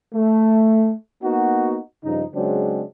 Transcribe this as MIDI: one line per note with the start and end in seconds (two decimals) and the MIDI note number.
0.14 0.91 57
1.23 1.77 58
1.23 1.77 59
1.23 1.77 63
1.23 1.77 66
2.03 2.23 43
2.03 2.23 49
2.03 2.23 53
2.03 2.23 63
2.34 2.82 49
2.34 2.82 54
2.34 2.82 56
2.34 2.82 60
2.34 2.82 62